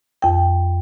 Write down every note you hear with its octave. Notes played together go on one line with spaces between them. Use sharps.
F2 G5